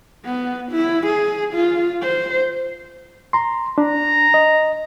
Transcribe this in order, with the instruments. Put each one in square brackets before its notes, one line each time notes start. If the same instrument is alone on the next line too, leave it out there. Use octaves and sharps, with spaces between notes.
[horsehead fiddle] B3
E4
G#4
F4
C5
[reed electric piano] A#5 C6
[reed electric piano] D4 [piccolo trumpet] A#5
[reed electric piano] D#5